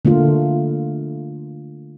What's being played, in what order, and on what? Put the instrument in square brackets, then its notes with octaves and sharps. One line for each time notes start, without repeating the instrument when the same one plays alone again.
[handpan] D3 A3 A#3 F4